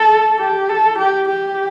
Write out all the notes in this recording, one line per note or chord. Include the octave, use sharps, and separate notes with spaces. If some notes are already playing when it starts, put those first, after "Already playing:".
Already playing: A4
G4
A4
G4
G4